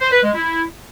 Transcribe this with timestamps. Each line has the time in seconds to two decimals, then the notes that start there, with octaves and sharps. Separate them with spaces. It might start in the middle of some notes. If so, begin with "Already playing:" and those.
0.01 C5
0.12 B4
0.23 G#3
0.34 E4